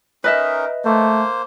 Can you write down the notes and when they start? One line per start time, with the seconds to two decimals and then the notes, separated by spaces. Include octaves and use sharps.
0.24 C#4 D#4 A#4 B4 D#5 E5
0.85 A3 A#3 C5